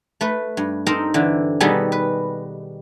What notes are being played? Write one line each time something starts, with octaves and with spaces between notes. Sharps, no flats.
A3 B4
G2
C4 D#4 A4 A#4 C5
D3 E3
B2 D#3 G3 B3 G#4 A4
B4